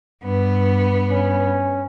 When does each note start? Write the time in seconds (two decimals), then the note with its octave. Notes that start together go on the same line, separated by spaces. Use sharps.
0.23 G2 B3
1.11 C#4